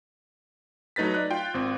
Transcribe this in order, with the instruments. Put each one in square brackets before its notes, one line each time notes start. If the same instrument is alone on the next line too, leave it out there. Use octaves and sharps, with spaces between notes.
[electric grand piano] F#3 A3 D#4 B4 A6 B6
D5 F#6
F4 G5
G#1 C4